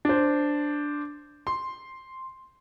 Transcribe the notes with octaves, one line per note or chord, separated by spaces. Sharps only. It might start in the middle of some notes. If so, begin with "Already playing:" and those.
D4 C5
C6